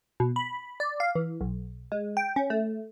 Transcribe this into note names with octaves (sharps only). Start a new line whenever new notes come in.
B2
B5
D5
F5
E3
B1
G#3
G5
C#4
A3